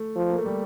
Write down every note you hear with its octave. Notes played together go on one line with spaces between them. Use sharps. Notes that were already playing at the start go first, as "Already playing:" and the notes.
Already playing: A3
F3
A#3
A3
G3